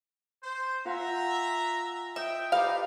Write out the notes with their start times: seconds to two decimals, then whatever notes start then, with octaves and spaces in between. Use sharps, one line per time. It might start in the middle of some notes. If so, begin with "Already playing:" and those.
0.42 C5
0.85 F4 E5 F#5 G#5 A#5
2.16 D#5 E5 G5 D#6
2.52 D#4 G4 B4 D5 F5